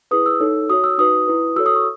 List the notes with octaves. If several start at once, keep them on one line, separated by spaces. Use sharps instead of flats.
E4 G#4 B4 D#6
E6
D#4 A4 C#5
F#4 C#5 D#6
E6
D#4 F#4 B4 D#6
E4 B4
F#4 A4 C#5 E6
D#6
C#6